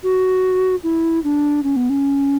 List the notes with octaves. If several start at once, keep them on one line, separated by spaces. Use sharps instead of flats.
F#4
E4
D4
C#4
B3
C#4